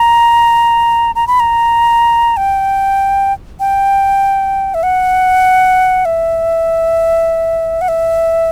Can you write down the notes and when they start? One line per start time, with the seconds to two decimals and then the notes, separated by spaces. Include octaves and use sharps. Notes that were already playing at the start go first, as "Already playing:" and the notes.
Already playing: A#5
1.15 A#5
1.27 B5
1.40 A#5
2.37 G5
3.60 G5
4.74 E5
4.83 F#5
6.05 E5
7.81 F#5
7.88 E5